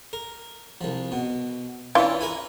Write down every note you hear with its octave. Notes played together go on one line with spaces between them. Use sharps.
A#4
C2 F3
B2
E3 C#4 D4 F4 D5
A#4 B4 G#5